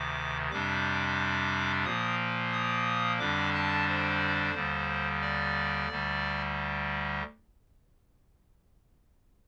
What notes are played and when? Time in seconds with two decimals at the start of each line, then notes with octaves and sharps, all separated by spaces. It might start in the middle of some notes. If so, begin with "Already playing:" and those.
Already playing: D2 C3 D#3 D6
0.51 F2 C3 G3 D4 D6
1.85 A#2 F3 A#3 D#6
2.52 D#6
3.19 F2 D3 G3 D4 D6
3.54 A5
3.88 C5
4.54 D#2 D3 G3
5.21 D5
5.89 D2 D3 G3